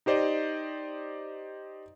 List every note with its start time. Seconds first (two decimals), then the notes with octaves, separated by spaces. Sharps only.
0.06 D#4 G4 C5 D5 D#5